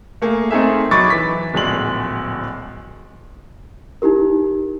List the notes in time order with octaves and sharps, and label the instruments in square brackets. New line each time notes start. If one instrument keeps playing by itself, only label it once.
[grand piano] A3 A#3 G#4
A3 C4 D#4 G#4 A#4 E5
F#3 D#4 B5 C#6 D6 A6
E3 B6
D1 A#1 G#3 F#7
[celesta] D#4 E4 G4 A#4